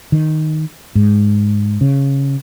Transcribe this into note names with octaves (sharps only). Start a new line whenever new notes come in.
D#3
G#2
C#3